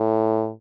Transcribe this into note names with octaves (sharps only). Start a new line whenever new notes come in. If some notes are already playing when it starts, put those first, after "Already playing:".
Already playing: A2